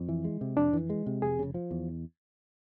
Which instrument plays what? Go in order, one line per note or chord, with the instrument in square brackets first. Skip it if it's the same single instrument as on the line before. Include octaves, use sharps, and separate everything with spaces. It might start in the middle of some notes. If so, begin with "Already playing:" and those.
Already playing: [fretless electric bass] F2
E3
G#3
C3
[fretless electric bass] F2 [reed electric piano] D4
[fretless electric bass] E3
G#3
C3
[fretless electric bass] F1 [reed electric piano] G#4
[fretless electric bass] C#3
F3
E2